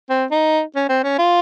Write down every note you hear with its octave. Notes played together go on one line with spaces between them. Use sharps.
C4
D#4
C#4
C4
C#4
F4